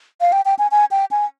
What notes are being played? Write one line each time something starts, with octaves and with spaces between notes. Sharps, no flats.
F5
G5
G5
G#5
G#5
G5
G#5